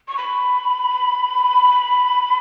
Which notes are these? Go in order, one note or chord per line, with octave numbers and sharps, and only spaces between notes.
C#6
B5